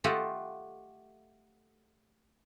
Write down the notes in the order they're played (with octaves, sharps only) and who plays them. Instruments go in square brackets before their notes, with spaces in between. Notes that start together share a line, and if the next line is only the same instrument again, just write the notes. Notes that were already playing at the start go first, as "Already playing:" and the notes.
[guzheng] A3 F4 G4 A4 D#5 F#5